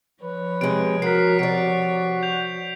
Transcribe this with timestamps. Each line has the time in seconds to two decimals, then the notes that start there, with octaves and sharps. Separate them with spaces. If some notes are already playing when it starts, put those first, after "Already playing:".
0.22 F3 B4 C#5
0.61 C3 G#3 D7
1.02 F#4 A#4 B6 C7
1.39 C3 F#4 D5 D7
2.23 G6 F7